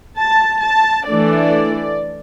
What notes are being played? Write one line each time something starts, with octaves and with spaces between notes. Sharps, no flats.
A5
A5
E3 A3 D4 D5